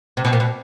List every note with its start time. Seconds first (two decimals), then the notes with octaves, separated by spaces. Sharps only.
0.17 C3
0.25 B2
0.33 A#2
0.40 B2